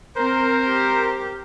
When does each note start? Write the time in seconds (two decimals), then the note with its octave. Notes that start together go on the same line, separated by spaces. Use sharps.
0.16 C4 A#4 C5
0.66 G4